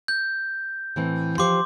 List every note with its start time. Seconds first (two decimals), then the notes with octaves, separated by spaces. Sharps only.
0.08 G6
0.96 A2 E3 C4
1.38 F3 G4 C5 C6 D6